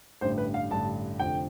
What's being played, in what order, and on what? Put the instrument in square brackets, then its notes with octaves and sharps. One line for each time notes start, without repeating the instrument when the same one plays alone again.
[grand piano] A1 G2 D3 C5
B4
F5
A1 G2 D3 A5
F1 F2 D3 G5